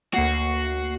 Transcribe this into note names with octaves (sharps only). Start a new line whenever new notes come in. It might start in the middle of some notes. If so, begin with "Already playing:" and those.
D2 A#3 F#4 C7